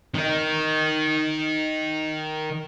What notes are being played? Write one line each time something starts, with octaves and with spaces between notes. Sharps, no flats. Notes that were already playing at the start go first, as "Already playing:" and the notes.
D#3 D#4